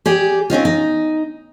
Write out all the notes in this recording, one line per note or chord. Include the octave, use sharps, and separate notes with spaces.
G4 G#4 D5
C4 C#4 D#4 F4
D#4